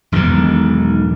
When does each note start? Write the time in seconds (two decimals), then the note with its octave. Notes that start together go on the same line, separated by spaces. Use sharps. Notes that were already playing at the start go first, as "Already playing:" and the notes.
0.12 E1 B1 G#2 D#3